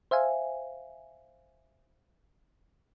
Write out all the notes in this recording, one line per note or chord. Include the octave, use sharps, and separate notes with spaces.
C5 E5 F5 G#5